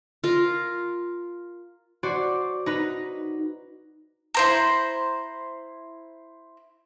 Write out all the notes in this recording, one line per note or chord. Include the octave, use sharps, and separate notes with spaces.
F4 A#4
F#4 C5 D5
D#4 B4
E4 C5 A#5